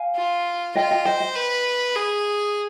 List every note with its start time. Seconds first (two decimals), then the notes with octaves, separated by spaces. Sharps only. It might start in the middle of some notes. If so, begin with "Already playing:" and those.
Already playing: F5 G#5
0.16 F4
0.75 F4 D#5 G5
0.91 D#5 G5
1.05 C5 D#5 G5
1.20 D#5 G5
1.36 B4
1.96 G#4